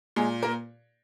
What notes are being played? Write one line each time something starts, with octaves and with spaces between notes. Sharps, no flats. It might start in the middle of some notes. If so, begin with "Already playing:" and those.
A#2 G#3 G#4
A#3 A#4